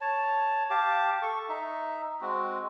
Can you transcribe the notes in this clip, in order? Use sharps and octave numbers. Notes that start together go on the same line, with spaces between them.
C#5 A5
G4 F5 A5 D6
A4 C#6
D#4 E5
G#3 C4 F#4